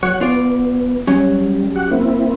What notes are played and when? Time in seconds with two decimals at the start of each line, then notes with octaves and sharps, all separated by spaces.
0.03 F#3 C#5 F#5
0.21 B3 F4 D5
1.07 F#3 G3 C#4
1.76 F#4 G4 F#5
1.91 A#3 C4 E4